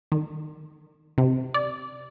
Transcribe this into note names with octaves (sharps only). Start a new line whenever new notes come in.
D#3
C3
D5